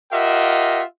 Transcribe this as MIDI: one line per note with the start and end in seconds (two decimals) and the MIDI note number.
0.12 0.83 65
0.12 0.83 67
0.12 0.83 70
0.12 0.83 75
0.12 0.83 76
0.12 0.83 78